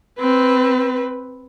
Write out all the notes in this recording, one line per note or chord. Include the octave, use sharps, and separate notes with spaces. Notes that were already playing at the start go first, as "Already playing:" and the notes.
C4 B4